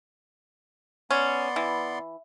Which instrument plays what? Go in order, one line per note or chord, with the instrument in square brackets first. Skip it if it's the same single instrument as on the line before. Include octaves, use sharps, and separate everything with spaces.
[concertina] B3 D5 C6 [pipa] C#4
[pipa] E3